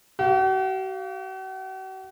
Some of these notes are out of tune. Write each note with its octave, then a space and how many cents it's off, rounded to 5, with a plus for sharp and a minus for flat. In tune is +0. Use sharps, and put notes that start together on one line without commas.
F#4 +45 F5 +0